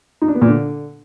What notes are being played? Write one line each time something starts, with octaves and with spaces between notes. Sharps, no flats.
D#4
D4
B3
A#2
D3